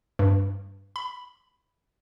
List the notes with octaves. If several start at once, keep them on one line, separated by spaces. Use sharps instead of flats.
G2
B5